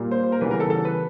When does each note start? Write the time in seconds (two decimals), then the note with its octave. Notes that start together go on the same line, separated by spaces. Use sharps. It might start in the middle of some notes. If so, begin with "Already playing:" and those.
Already playing: A#2 G3 A#3
0.11 C5
0.32 A#4
0.41 C#3 E3 G3 B3 B4
0.51 A#4
0.60 A4
0.70 A4
0.85 B4